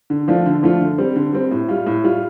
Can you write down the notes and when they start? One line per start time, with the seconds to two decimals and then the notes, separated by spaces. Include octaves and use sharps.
0.10 D3
0.28 F3 A3 D4 F4
0.46 D3
0.63 F3 A3 D4 F4
0.80 D3
0.98 G3 C4
1.16 D3
1.33 G3 C4
1.51 A2
1.69 G3 F4
1.87 A2
2.04 G3 F4